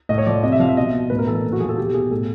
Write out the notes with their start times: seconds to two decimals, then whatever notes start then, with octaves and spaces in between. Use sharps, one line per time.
0.09 A2 D#5
0.18 C#5
0.26 F3 D5
0.43 C3 D#5
0.52 E5
0.59 F3 F5
0.69 E5
0.77 B2 D#5
0.94 B2
1.10 A2 B4
1.19 A#4
1.27 E3 A4
1.35 A#4
1.45 A#2
1.52 F#4
1.60 F3 G#4
1.69 A4
1.74 G#4
1.78 B2 G4
1.94 B2 G#4
2.11 A2 A4